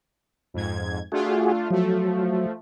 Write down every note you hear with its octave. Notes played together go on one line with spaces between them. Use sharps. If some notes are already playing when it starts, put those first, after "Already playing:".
F2 G#2 G#6
A3 D4 F4 F#4 G#4
F3 F#3 A3